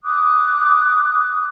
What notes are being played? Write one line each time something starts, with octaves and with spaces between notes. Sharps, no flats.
D6 D#6 F#6